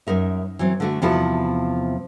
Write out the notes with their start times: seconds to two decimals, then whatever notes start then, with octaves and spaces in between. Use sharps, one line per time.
0.07 F#2 D#4 A#4 E5
0.59 E3 F#3 C4
0.80 D3 A3 F#4
1.02 E2 C3 F3 E4 F#4 A4